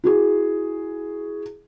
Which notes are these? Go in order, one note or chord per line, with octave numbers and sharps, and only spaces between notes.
E4 F#4 G#4